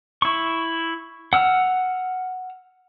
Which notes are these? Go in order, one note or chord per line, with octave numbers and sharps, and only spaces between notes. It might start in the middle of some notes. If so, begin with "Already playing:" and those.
E4 C#6
F#5 E6 F6